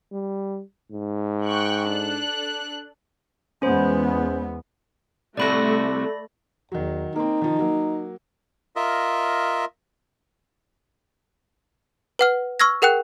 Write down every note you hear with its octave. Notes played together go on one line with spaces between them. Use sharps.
G3
G#2
G5 C#6 F#6
D4 A4 F#6
E2 G#3 B3 C#4 C5
C2 C3 A3 F#4 D5 B5 A#6
E2 D#3 F#3
A#3 C4 D#4
D#3 F3
F#3 A#3
F4 A#4 D#5 E5
B4 F#5 F6
C#6 E6 F6 G#6 A#6
G#4 A#4 F#5 G5 F#6